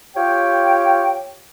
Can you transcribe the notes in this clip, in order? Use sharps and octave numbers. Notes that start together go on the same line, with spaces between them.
F4 G4 C#5 G5